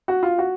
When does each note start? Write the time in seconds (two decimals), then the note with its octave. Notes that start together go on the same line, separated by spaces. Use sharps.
0.08 F#4
0.23 F4
0.38 F#4